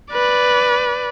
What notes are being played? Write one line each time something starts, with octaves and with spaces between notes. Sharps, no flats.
B4 D5